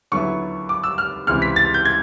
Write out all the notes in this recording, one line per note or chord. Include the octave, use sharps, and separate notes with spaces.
D#2 D3 F#3 B3 E4 C#6
D6
E6
F6
C#2 C3 E3 F6
B6
A6
G6
G#6